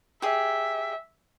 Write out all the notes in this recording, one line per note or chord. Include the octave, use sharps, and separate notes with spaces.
G4 G#4 E5